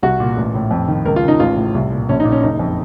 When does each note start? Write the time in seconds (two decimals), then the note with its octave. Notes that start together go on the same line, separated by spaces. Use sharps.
0.03 C2 F#4
0.20 A#2
0.37 A1
0.54 A2
0.71 F2
0.88 D#3
1.05 C#2 A#4
1.16 F4
1.23 C#3
1.28 D#4
1.40 A1 F4
1.56 A2
1.74 C2
1.92 A#2
2.09 A#1 C#4
2.20 D#4
2.25 A#2
2.32 C#4
2.43 F#1 D#4
2.59 F2